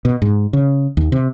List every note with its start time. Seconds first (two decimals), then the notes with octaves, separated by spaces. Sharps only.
0.05 B2
0.22 G#2
0.53 C#3
0.97 D#2
1.12 C3